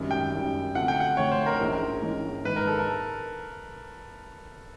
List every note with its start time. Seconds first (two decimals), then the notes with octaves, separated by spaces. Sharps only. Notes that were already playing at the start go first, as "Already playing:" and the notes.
Already playing: G#1 F#2 D#3 G3
0.11 G5
0.32 G#1 F#2 D#3 G3
0.75 D2 D3 F3 A3 C4 F#5
0.88 G5
1.00 F#5
1.17 D2 D3 F3 A3 C4 C#5
1.32 C5
1.46 A#4
1.60 A#1 G#2 E3 G#3 C#4
2.02 A#1 G#2 E3 G#3 C#4
2.45 G#2 D#3 G#3 B4
2.56 A#4
2.67 A4
2.79 A#4